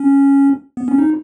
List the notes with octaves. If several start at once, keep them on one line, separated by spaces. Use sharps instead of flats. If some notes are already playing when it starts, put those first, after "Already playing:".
Already playing: C#4
B3
C#4
D#4